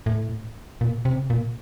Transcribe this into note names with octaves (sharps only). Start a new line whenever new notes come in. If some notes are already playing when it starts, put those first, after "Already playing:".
A2
A#2
C3
A#2